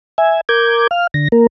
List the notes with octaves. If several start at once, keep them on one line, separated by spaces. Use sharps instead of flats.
E5 G#5
A#4 D6 G6 G#6
F5 F6
D3 A#6
A#3 A#4